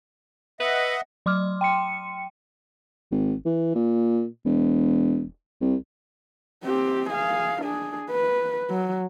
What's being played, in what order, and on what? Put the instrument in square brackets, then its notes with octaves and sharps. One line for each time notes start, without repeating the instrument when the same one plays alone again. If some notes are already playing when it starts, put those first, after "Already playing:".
[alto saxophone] B4 [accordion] D#5 E5 F#5
[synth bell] F#3 C6 D6 F6
G5 C6 C#7
[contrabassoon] G#1
E3
A#2
E1
C2
[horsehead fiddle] C4 G4
G#4 F5
D4 G#4
B4
F#3